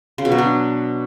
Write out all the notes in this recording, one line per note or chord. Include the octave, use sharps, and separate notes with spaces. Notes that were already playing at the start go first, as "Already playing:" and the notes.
C#3
B2
F#3
D4